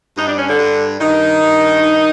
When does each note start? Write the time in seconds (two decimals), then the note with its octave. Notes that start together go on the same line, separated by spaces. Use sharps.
0.17 G2 D#4
0.27 D4
0.38 C#4
0.48 D3 D4
0.59 G2
0.99 G2 D#3 D#4
1.41 G2
1.82 D#3